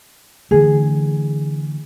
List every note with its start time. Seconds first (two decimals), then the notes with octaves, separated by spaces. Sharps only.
0.51 D3 E3 A3 G#4